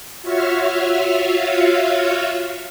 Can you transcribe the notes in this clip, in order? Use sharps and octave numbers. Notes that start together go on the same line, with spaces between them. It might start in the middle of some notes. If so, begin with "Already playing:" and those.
F4 F#4 C#5 E5 F5